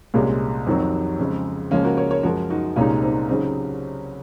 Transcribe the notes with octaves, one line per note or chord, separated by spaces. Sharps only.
C2 A#2 G#3 C#4 F4
F2 D#3 F#3 C4
F2 C#3 G#3
C#2 C#3 F3 G#3 A#3 C#4
F#4 A#4
A#4 C#5
A#4 C#5
F#2 F3 G#3 F#4 A#4
D#4 F#4
C2 A#2 G#3 C#4 D#4 F4
C4 D#4
C#3 F#3 C4 D#4